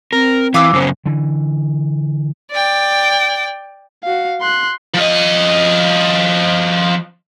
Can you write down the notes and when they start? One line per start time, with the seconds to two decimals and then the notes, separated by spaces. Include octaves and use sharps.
0.13 C4 A#4
0.54 E3 F5 D6 E6
0.73 F#2 C#3 B3 C5
1.06 D3 E3
2.51 D5 G5
4.04 F#4 F5
4.41 C6 F#6
4.95 F3 D#5